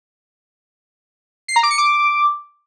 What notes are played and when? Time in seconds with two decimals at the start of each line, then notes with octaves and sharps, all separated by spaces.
1.48 C7
1.56 A#5
1.63 D6
1.71 C#7
1.78 D6